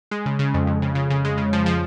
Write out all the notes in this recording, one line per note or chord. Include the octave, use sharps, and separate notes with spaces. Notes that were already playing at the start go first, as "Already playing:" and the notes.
G#3
C#3
C#3
F2
F2
C#3
C#3
C#3
G#3
C#3
F3
F3